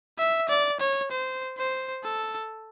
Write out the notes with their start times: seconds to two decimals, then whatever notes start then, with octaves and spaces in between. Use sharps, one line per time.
0.18 E5
0.49 D5
0.80 C#5
1.11 C5
1.58 C5
2.04 A4